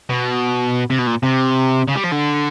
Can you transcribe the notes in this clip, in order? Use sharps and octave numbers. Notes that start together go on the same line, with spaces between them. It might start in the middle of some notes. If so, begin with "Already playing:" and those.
B2
C3
B2
A#2
C3
C#3
G3
F3
D3